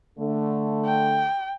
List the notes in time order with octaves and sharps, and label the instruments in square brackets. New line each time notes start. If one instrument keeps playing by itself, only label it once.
[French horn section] D3 A3
[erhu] G5